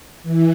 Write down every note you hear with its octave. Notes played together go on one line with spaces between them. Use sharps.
E3